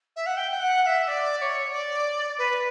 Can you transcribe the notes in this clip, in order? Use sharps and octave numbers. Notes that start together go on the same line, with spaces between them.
E5
F#5
G5
G5
F#5
F#5
E5
E5
D5
D5
C#5
D5
B4